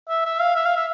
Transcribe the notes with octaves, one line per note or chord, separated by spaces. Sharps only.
E5
E5
F5
E5
F5
E5